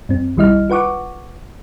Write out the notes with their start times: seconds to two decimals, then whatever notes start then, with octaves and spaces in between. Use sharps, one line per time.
0.09 F#2 C4
0.37 B1 D#3 G3 E4 D#5 F6
0.70 F4 B4 F#5 C#6 D6